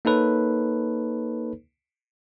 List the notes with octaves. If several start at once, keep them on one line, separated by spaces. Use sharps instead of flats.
A#3 D#4 A4 B4 C#5